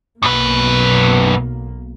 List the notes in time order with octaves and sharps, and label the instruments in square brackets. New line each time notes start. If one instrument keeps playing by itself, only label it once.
[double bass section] B1 A#3 [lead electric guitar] F#2 B4